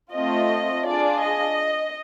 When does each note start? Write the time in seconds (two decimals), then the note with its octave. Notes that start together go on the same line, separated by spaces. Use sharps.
0.14 A3 C4 F4 D#5
0.85 D4 F4 G#4 D5
1.21 D#5